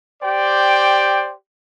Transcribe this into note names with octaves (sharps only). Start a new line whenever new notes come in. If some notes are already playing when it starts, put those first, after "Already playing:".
G4 C5 D5 G5